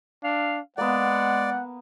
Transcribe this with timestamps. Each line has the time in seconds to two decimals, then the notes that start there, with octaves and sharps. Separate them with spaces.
0.24 D4 F5
0.78 G#3 A#3 B3 D5 F#5